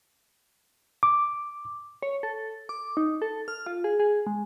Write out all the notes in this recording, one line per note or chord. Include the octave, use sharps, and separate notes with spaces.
D6
C#5
A4
D6
D#4
A4
F6
F4
G#4
G#4
G#3